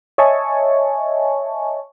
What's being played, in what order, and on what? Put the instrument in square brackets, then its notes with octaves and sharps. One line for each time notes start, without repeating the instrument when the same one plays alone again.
[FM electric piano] C#5 D#5 E5 G#5 A5 C#6